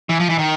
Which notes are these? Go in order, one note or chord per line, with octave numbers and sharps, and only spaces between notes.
E3
F3
E3
D#3